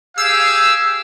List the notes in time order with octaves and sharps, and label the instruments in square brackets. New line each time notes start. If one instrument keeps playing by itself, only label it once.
[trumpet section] G4 G#4 F5 [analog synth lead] E6